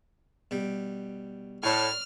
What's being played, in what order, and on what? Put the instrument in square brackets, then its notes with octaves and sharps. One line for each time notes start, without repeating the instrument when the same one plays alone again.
[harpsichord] B2 G3 G5
[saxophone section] A2 [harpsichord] C#5 D5 C6 [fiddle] F6